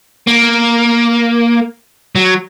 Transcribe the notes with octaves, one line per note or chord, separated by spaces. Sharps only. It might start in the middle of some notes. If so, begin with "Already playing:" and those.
A#3
F#3